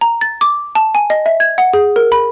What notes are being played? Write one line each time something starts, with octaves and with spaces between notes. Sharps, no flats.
A#5
A6
D6
A5
G#5
D#5
E5
G#6
F#5
G#4
A#4
B5